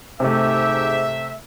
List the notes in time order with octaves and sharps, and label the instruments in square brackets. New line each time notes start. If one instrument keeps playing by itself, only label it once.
[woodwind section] G#2 G4 [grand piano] C3 A3 [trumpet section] E5